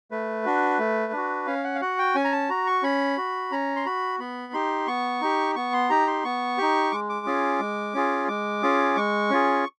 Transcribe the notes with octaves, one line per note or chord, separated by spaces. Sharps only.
A3 B4
D4 F#4
A3
D4 F#4
C#4 F5
F#5
F5
F#4 F#5
G5
C#4 G#5
A#5
A5
F#4 A#5
C#6
C#4 B5
F#4
C#4 A#5
C6
F#4 B5
B3 B5
D#4 G4 C6
B3 C#6
D#4 G4
B3 C#6
C6
D#4 G4 A#5
C6
B3 C#6
D#4 G4
G#3 D6
D6
C#4 F4 G#4
G#3
C#4 F4 G#4
G#3 D6
C#4 F4 G#4
G#3 C#6
C#4 F4 G#4